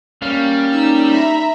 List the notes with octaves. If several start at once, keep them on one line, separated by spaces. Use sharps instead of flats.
G3 A#3 C#4 F5
D#4 E6
E5 A#5 B5